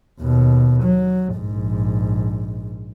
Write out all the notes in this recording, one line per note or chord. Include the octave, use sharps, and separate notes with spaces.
D#2 B2
F#3
A#1 G#2